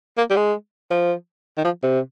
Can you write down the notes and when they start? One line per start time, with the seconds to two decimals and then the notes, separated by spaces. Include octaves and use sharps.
0.18 A#3
0.30 G3
0.36 G#3
0.91 F3
1.57 D#3
1.65 F3
1.83 C3